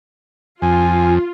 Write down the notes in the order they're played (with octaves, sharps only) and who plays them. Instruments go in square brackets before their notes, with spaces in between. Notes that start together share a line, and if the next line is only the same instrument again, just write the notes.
[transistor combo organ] F2 [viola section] F4 [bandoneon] G#5